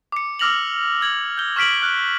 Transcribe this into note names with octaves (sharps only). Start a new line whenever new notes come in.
D6 C#7
D6 E6 F6 A#6 F7 F#7
E6 G#6 F#7
G6 G7
C#6 F6 B6 D7 F#7
F6 F#6